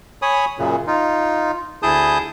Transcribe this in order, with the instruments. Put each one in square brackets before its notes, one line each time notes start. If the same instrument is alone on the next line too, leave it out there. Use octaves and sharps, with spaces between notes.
[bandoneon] C#5 G#5 B5 D#6
F#2 A#2 C#3
D#4 F4
D2 E4 G#4 A5 D#6 G6